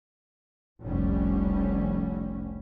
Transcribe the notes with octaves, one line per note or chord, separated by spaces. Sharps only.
F1 C2 D3 G3 C#4